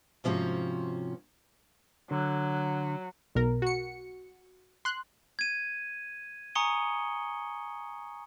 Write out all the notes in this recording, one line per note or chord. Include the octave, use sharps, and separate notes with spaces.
G#2 C3 F3 C#4 F#4
D3 F#3
B1 B2 A#4
F#4 C#7
C6 F#6
G#6 D#7
G#5 A#5 C#6 D#6 C#7 G7